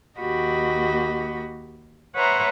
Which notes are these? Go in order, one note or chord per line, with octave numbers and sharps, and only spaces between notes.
D#2 A#3 F#4 G4 D#5 B5
B4 C#5 E5 F#5 A#5 C6